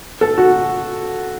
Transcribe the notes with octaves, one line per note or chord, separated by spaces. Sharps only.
A4
F#4